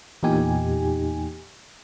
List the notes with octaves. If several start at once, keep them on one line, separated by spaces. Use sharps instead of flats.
E2 A#2 D#4 G4 G#5